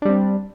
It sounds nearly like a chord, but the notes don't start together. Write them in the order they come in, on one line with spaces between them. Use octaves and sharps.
D4 G3 C4